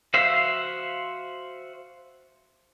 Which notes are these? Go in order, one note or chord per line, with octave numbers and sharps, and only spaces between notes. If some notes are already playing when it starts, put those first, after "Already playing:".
F#4 C5 E5 F5